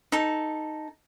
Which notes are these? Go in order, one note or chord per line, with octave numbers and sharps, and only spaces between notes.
D#4 A4